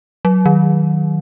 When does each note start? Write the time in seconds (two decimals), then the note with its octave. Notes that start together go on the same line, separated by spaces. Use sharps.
0.25 F#3
0.46 D#3